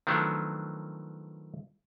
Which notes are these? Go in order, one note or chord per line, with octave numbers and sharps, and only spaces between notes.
D#3 F3 F#3 A3 B3 D4